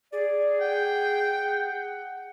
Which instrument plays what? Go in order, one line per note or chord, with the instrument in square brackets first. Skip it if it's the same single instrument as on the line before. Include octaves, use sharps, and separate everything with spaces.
[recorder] G#4 [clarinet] D5
[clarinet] F#5 [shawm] G5